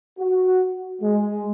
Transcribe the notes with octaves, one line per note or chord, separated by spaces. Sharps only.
F#4
G#3